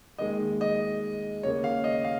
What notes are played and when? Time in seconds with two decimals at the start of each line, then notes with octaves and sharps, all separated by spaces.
0.18 D#2 D#3 G#3 D#5
0.61 D#5
1.43 D#2 C#3 A#3 C#5
1.64 F5
1.84 D#5
2.04 F5